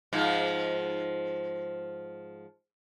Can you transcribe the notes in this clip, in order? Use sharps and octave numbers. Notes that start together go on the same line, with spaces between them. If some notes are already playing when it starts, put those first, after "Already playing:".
G#2 F3